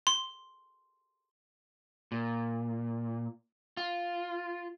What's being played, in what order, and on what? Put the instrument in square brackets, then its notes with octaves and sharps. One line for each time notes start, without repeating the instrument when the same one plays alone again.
[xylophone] C6
[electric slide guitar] A#2
F4